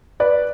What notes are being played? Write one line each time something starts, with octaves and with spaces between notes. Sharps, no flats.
B4 D5